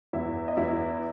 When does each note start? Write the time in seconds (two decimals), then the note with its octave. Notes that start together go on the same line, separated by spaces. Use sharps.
0.13 E2 E4 E5
0.48 D#5
0.57 E2 E4 E5